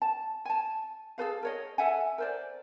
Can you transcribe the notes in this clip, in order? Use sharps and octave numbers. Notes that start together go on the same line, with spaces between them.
A5
G#5 A5
G#4 A4 B4 F5
A#4 C#5 D#5
A4 E5 F#5 G#5
A#4 C5 D5